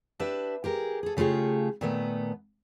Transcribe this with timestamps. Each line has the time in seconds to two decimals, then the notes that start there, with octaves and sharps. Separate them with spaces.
0.20 D4 G4 B4 E5
0.64 G4 G#4 A#4
1.03 G#4 A4
1.17 C#3 A3 F4 G4 G#4
1.81 A#2 D#3 A3 B3